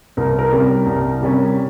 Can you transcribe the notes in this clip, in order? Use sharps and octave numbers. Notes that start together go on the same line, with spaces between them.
C2 A#4
A#4
C3 G3 C#4
C2
C3 G3 C#4